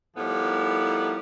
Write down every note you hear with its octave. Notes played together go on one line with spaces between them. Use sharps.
A2 D#3 F3 G3 B3